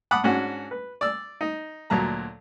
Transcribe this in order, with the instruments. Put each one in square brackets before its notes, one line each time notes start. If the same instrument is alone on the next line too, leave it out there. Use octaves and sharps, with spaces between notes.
[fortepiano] F#5 A5 B5 D6 D#6 F#6
G#2 C#4 D4 F#4 F#5
B4
D5 E6
D#4
D2 A#2 F#3 A5 A#5